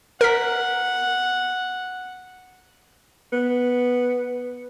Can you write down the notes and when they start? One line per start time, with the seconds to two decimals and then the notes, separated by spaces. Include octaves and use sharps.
0.21 A#4 F#5 B6
3.33 B3